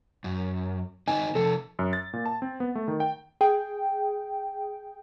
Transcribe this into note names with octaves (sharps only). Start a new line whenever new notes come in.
F#2
D#3 C4 D#4 G#5
C3 F3 A4
F#2
A6
A#2
A5
C4
B3
A3
D#3
G5
G#4 G5